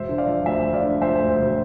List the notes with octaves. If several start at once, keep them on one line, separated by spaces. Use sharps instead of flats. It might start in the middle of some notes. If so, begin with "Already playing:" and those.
Already playing: E1 C5 E5
D3
D5 F5
F3
D2 C5 E5
E1
D5 F5
D3
F3 C5 E5
D2
C5
E1